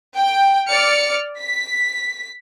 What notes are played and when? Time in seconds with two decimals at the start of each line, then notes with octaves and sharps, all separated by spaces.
0.15 G5
0.69 D5 F6 C#7
1.40 B6